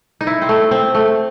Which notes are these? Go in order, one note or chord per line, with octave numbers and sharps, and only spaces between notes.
D#4
E4
C4
A3
C4
A3